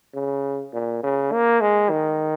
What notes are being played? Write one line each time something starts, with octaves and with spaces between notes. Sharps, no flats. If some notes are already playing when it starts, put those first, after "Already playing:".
C#3
A#2
C#3
A#3
G#3
D#3